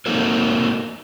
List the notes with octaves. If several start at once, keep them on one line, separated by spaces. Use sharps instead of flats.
A#3 D#4 F#4 A4 A#4